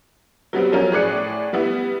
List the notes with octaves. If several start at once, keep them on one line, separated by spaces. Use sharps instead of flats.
F#3 G3 B3 C4
F3 F#3 C#4 A#4
A2 G#4 D5 F#6 C#7
G3 B3 E4